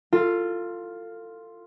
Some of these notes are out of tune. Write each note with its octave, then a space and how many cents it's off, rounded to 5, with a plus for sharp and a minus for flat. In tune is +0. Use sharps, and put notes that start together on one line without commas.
F4 +0 A4 +30